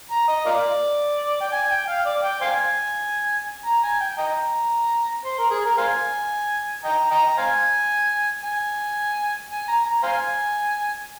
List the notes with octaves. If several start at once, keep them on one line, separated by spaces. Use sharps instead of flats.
A#5
D#5
F4 A#4 D5
G5
G#5
G5
F5
D5
G5
C5 F5 G#5
A#5
G#5
G5
D#5 G5 A#5
C5
A#4
G#4
A#4
C5 F5 G#5
D#5 G5 A#5
D#5 G5 A#5
C5 F5 G#5
G#5
G#5
A#5
A#5
C5 F5 G#5